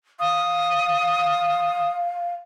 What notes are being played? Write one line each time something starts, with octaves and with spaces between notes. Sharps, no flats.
F5 D#6